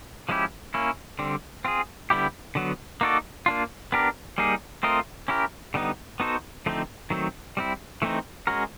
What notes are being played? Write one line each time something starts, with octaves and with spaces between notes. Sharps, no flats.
F3 G#3 C#4 E4 G4
A#3 C#4 E4
D3 G3 C4
C4 F4 G#4
D3 G3 B3 E4 G4
D3 F#3 B3
A#3 D#4 F#4 A4 D5
A#3 D4 F4
B3 D4 G4 A#4
G3 A#3 D#4 G#4
A3 C4 F4 A#4 D#5
C#4 E4 G4 A#4
D3 G3 B3 D#4
B3 D#4 F#4 A4 C5
D3 F3 A3 C4 D#4
D#3 F#3 A3 C4
G3 C4 E4
E3 A3 C4 D#4
G#3 C#4 F#4 A#4